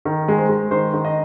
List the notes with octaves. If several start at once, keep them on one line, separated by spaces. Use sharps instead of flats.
D#3
G#3
C5
G#3
D#3 C5
D#3
D#5